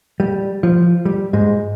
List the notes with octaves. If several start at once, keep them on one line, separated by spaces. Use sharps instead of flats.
G3
F3
G3
G#2 G#3